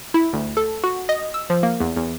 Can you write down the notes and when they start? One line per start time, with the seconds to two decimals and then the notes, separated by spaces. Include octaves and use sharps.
0.14 E4
0.33 D2
0.57 A4
0.84 F#4
1.09 D#5
1.34 E6
1.50 F3
1.63 A#3
1.80 E2
1.96 E2